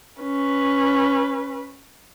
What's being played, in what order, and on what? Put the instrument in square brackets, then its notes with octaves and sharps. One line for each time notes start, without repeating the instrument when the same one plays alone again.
[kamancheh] C#4 B4